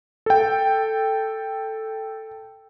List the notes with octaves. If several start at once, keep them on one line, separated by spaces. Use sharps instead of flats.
A4 G5